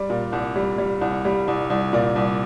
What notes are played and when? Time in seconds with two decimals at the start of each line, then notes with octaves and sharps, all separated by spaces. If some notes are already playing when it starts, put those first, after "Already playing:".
Already playing: G3 D5
0.10 A#2
0.32 C2
0.56 G3
0.78 G3
1.01 C2
1.25 G3
1.48 C2
1.70 C2
1.93 A#2 D5
2.16 C2